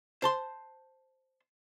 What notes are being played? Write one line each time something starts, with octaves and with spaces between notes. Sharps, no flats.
C5 A5 C6